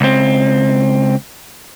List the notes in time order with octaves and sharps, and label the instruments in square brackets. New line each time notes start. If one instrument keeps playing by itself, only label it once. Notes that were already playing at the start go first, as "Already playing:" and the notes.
[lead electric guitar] C#2 C4